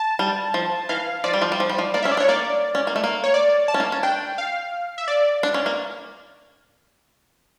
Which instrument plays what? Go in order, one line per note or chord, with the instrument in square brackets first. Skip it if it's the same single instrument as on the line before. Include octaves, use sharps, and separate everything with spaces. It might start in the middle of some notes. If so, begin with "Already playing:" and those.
Already playing: [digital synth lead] A5
[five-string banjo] G3
F3
[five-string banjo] E3 [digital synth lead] F5
[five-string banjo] F3 [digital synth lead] D5
[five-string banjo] G3
F3
G3
F3
G3
F3
[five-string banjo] A#3 [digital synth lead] D5
[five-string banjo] C#4 [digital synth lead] E5
[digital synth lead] D5
[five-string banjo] D4
[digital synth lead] C#5
[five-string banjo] A#3 [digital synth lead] D5
[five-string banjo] C#4
A#3
A3
A#3
[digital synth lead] C#5
D5
A5
[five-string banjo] C#4
A#3
C#4
[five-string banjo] D4 [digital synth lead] G5
[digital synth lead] F5
E5
D5
[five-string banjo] D4
C#4
A#3